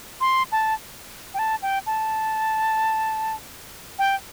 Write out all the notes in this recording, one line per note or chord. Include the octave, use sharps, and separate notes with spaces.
C6
A5
G5
A5
G5
A5
G5